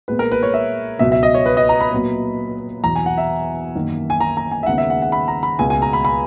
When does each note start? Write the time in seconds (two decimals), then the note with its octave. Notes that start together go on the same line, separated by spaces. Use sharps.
0.08 A#2 G#3 B3 B4
0.19 A#4
0.32 B4
0.43 C#5
0.54 E5
0.99 C#2 B2 F#3 E5
1.12 E5
1.23 D#5
1.35 C#5
1.46 B4
1.57 D#5
1.69 A#5
1.81 B5
1.92 A#2 F#3 B3
2.84 E2 B2 F#3 A#5
2.95 G#5
3.06 F#5
3.18 E5
3.75 F#2 D#3 A#3
4.10 G#5
4.21 A#5
4.37 A#5
4.51 G#5
4.63 E5
4.66 D#2 C#3 G#3 B3 F#5
4.78 E5
4.90 F#5
5.02 F#5
5.12 B5
5.28 A#5
5.43 B5
5.59 C#2 B2 G#3 G#5
5.70 G#5
5.82 A#5
5.93 B5
6.05 B5